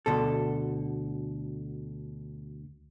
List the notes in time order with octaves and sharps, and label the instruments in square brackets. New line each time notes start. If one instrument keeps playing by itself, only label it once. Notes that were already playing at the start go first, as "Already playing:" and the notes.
[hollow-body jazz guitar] D2 B2 A4